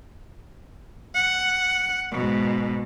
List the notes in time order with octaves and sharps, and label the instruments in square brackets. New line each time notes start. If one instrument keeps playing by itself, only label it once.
[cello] F#5
G#2 B2